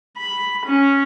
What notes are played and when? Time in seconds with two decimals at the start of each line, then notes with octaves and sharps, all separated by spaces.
0.17 B5
0.66 C#4